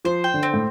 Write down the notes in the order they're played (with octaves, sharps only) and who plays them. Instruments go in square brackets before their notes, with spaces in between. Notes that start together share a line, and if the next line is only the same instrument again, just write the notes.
[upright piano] F3 [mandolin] C5
[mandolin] G5
[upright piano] D3
[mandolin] C4
[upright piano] A2